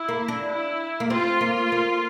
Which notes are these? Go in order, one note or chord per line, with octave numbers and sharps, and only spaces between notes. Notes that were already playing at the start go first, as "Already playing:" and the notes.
Already playing: E4
A#3
D4
E4
A#3
C4 F4
A#3
A#3